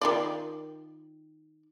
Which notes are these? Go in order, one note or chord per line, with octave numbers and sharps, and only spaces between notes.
D#3 F4 D5